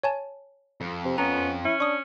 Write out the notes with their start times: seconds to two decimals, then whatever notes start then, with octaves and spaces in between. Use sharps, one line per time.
0.03 C#5 G#5 A5
0.81 F2
1.05 C3
1.18 B3 C#4 A#5
1.65 C#4 E4
1.80 D4 C#6 D#6